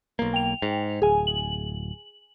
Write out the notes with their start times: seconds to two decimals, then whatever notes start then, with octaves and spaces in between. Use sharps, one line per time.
0.19 B1 A#3
0.34 G5 F7
0.62 G#2
1.02 D1 G#4 G#5
1.27 F#7